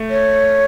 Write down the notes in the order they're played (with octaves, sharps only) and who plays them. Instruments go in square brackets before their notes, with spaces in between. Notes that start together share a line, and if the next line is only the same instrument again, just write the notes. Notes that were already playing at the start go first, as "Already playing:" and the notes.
Already playing: [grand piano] A3
[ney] C#5